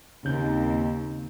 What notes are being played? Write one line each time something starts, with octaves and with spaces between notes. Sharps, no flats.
D#2 C#3 C4 G6